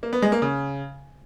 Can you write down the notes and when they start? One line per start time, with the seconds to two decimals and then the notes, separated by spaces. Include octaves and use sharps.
0.03 A#3
0.13 B3
0.22 G#3
0.32 A#3
0.42 C#3